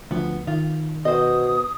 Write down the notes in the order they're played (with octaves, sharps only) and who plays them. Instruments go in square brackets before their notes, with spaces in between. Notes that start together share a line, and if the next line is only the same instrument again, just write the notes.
[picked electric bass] D2 F3 [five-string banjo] B3
[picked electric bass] D#3 [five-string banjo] F4
[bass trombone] B2 [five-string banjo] C5 D#5 [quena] D#6